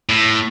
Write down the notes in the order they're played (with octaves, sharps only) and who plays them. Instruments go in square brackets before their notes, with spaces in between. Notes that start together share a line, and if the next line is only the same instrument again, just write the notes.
[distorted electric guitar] A2